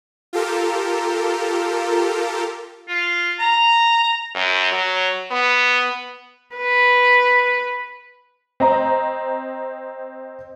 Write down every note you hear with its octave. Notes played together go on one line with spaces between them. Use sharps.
F4 G4 A4 A#4
F4
A#5
F#2
F#3
B3
B4
C4 D#5 A#5